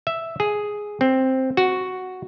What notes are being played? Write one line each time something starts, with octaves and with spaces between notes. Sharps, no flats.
E5
G#4
C4
F#4